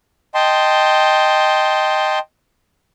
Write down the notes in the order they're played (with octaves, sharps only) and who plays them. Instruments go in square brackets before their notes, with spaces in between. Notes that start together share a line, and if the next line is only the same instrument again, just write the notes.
[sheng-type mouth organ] D#5 G5 A5 C6